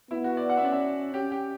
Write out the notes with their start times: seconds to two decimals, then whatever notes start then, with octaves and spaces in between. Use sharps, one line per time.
0.11 B3 E4
0.24 F#4
0.37 D5
0.49 F#5
0.57 E5
0.62 C#4 D5
0.72 E5
1.14 C#4 G4
1.32 G4